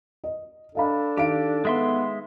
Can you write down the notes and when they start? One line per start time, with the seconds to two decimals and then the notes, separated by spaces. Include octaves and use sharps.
0.24 D#5
0.75 D4 A4 D#5 F5 B5
1.17 D#3 G4 F5 D7
1.65 G#3 B3 E5 C6